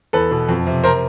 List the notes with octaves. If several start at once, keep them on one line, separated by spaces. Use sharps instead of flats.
E2 A4 B4
B2
F2
C3
A#4 C5